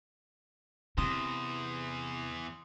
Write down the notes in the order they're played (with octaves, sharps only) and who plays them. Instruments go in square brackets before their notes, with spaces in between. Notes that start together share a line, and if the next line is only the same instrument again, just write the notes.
[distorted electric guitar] E2 [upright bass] C3 [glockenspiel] C6 D#6 E7